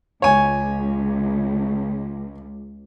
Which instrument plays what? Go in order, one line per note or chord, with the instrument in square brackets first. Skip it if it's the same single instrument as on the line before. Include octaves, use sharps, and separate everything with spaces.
[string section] C#2 [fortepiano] C#5 G#5